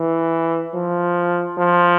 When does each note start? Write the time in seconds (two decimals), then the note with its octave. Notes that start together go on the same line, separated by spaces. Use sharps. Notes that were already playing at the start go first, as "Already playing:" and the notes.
Already playing: E3
0.74 F3
1.58 F3